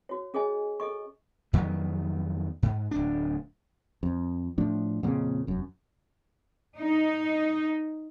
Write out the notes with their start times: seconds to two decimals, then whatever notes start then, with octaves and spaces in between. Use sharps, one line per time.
0.09 F#4 C#5
0.34 C#4 G#4 C#5 D#5 G#5
0.80 A4 D#5 C#6
1.53 F2 D#3 F#3 B3
2.63 G#2
2.91 D1 D4
4.03 F2
4.58 A2 F3 D4
5.03 F2 A#2 C#3
5.47 F1 F#2
6.78 D#4